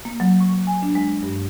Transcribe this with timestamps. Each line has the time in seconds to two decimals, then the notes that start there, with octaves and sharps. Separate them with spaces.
0.05 A#3
0.20 F#3
0.40 C#6
0.67 G#5
0.82 D4
0.95 G#3
1.23 G2